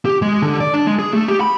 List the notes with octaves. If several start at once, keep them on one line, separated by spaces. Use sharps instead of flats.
G4
G#3
D3
D5
D4
G#3
G#4
A3
G4
B5